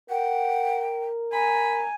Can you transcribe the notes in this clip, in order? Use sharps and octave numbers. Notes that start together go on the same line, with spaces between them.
A#4 F#5 G5
G#5 A#5 B5